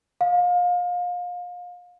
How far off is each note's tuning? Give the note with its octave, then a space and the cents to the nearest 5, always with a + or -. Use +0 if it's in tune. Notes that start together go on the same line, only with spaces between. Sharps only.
F5 +30